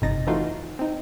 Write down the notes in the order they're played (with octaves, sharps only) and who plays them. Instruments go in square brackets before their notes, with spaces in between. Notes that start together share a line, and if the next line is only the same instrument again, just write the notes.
[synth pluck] G1 F2 C3 D#4 A6 A#6
E3 A3 D#4 F4 F#4 C5
C4 D#4